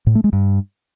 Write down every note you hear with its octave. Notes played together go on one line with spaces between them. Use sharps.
A2
A3
G#3
G2